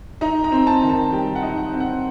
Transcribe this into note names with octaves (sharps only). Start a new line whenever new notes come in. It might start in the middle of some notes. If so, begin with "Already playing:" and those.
D#4 A#5
A#5
C4
A5
D#3
A5
G3 G5
F#5
D#4
F#5
C4
F#5